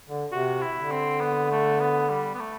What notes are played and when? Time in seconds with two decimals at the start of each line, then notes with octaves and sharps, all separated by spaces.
0.10 D3
0.32 C3 F#4
0.61 E4
0.77 D3
0.91 C4
1.21 B3
1.51 A3
1.80 B3
2.09 G3
2.34 B3
2.40 A3